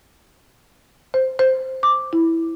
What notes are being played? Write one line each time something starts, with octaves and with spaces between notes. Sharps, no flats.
C5
C5
D6
E4